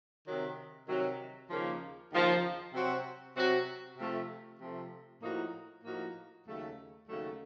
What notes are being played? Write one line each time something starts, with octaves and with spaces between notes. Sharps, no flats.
C3 D#3 F#3
C3 D#3 F#3
D#2 C#3 F3 A#3
D#2 C#3 F3 A#3
C3 F#3 C4 F#4
C3 F#3 C4 F#4
C3 F3 A3
C3 F3 A3
A2 F3 A#3 D#4 F#4
A2 F3 A#3 D#4 F#4
D#2 C#3 F#3 A3
D#2 C#3 F#3 A3